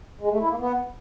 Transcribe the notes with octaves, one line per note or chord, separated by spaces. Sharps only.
G#3
A3
E4
A#3
B3